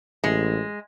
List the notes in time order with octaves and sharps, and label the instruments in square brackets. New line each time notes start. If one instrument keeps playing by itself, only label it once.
[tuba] A1 [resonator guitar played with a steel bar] G#3